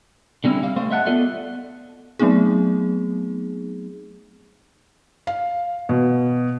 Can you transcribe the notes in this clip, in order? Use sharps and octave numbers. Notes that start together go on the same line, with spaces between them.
D3 G3 C4 C#4 E4
G3 F5
A3 C5 F5
D#5 E5 F#5 G5 A5
B3 F4 A4 D5 E5
F#3 A3 B3 C4 D#4 G#4
F5
B2